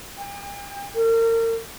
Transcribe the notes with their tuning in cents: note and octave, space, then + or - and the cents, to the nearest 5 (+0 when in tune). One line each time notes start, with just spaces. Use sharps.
G5 +40
A#4 -35